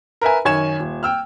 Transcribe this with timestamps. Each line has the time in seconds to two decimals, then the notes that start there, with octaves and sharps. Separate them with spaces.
0.21 A#4 B4 E5 G#5
0.45 F#2 D#3 C#5 G#5 G#6 E7
0.79 D#1
1.03 G5 E6 F6